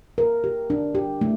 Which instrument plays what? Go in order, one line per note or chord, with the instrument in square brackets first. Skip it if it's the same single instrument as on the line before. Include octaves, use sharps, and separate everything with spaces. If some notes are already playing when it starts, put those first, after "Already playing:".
[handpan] A#4
G4
D4
G4
A3